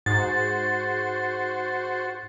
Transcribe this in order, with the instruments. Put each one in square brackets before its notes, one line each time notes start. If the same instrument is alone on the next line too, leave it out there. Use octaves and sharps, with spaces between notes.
[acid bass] G#2 [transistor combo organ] F#4 C5 [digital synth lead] A6